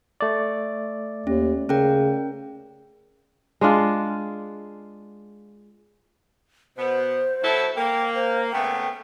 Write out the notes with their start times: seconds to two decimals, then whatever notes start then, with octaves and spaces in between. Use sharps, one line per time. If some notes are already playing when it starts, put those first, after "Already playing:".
0.21 A3 D5
1.27 D#2 C#4
1.69 C#3 C#4 A#4 G5
3.61 G#3 D4 F4
6.77 B2 B3 C5
7.42 F#3 E4 A4
7.76 A#3 G5
8.15 C5
8.52 C#3 A3 B3 G5